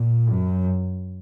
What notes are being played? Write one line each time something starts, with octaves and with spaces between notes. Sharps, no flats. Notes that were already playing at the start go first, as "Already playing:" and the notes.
Already playing: A#2
F#2